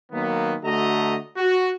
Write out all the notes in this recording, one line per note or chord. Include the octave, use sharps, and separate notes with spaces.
D#3 F#3 A#3 B3
D3 A3 F#4 D#5 A#5
F#4